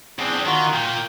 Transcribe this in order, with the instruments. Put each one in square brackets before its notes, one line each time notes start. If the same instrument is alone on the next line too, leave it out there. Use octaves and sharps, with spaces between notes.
[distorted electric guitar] E2 C4 [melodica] D4 G#4
[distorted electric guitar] D#3 [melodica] F4 F#4 A#4
[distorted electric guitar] A#2 [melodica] G5